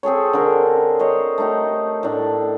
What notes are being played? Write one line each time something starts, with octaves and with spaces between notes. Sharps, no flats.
C4 G#4 A4 C#5
D3 A#4
C5 C#5 D#5
A3 D#4 G4
A2 D4